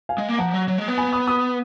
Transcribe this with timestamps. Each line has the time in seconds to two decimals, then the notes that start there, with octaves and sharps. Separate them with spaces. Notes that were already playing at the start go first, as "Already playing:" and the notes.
0.09 F5 G#5
0.18 G#3
0.29 A#3
0.38 F3 F#5 A#5
0.54 F#3
0.68 F#3
0.78 G#3
0.88 B3
0.98 G#5 B5
1.13 B5 D#6
1.27 B5 D#6